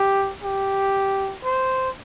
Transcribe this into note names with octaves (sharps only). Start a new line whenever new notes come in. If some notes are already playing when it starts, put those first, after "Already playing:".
Already playing: G4
G4
C5